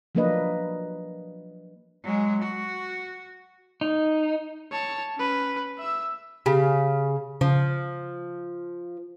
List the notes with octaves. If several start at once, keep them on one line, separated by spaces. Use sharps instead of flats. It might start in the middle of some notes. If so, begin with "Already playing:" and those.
F3 F#3 A#3 D4 B4 D#5
F#3 G#3
F#4
D#4
C#5 A5
C#4 B4
E5 E6
C#3 G4
C#3 F3